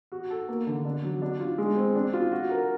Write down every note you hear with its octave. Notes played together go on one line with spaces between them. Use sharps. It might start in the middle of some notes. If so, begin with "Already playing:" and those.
F#4
A4
A#3
D3
D4
F#3
D4
F4
G#3
C4
D4
F4
F#4
A#4